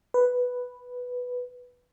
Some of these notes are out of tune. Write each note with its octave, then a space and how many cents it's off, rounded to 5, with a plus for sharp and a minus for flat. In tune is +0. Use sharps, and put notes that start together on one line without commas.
B4 +0